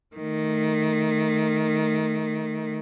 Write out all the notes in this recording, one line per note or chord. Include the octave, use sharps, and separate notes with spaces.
D#3 A3